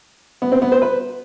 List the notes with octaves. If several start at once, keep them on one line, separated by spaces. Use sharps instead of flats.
B3
C4
B3
C5
B4